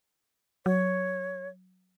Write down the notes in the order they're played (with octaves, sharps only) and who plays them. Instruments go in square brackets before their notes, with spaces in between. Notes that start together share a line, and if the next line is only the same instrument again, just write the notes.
[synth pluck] F#3 [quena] C#5